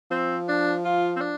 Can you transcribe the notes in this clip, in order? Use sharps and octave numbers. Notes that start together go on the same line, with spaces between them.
F3 C4
D4
F4
C4
D4